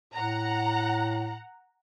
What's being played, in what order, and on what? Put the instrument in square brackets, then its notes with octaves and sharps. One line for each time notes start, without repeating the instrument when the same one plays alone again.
[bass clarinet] A2 [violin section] F#5 A#5